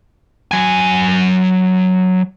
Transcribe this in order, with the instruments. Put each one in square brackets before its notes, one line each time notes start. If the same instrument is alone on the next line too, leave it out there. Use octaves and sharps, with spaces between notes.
[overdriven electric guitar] F#3 G#5